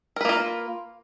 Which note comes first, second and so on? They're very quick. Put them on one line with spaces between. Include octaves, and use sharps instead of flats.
A#4 B4 A#3 F4